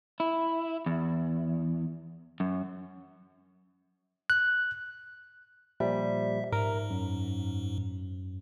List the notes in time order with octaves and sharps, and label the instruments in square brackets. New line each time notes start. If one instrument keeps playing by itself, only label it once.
[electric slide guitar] E4
E2
F#2
[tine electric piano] F#6
[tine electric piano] A#2 F3 G3 [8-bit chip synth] E5
[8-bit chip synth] G#2 [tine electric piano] A#4
[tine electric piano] F#2